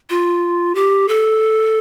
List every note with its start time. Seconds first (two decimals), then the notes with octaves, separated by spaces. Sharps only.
0.10 F4
0.75 G4
1.08 A4